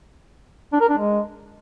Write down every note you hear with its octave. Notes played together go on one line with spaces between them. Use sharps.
D4
A#4
D4
G#3